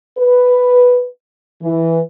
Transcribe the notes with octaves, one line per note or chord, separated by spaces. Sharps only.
B4
E3